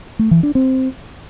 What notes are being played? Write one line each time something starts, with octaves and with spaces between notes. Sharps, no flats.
A3
E3
D4
C4